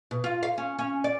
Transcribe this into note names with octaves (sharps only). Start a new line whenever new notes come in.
B2
F4
F5
C#4
C#4
D5